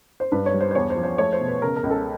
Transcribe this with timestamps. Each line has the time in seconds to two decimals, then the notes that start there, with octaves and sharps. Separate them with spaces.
0.20 C5
0.32 G2 B4
0.46 C#5
0.54 G3
0.61 C5
0.71 C5
0.75 E2 C#5
0.90 C5
0.96 F3
1.03 C5
1.18 A3 C#5
1.33 C5
1.40 B2
1.48 B4
1.62 C#3 A#4
1.76 A#4
1.83 C#2
1.90 A4